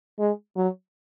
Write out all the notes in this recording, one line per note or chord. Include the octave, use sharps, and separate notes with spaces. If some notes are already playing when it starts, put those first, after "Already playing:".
G#3
F#3